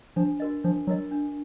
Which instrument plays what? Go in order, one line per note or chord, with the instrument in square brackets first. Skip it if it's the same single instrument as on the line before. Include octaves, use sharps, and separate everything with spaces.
[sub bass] F3 [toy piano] D4
[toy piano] F#4 A#4 D#5
[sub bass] F3 [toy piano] D4
[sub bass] F#3 [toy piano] F#4 A#4 D#5
[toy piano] D4